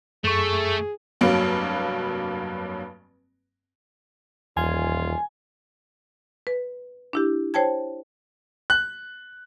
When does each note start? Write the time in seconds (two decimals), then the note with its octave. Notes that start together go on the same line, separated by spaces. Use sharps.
0.24 F#2 A3 G#4 C#6
1.21 F1 G2 F#3 A#3 D7
4.57 D#1 E2 F4 G#5
6.47 B4
7.13 D4 E4 G4
7.54 C5 C#5 G5 A5 G#6
8.70 F#6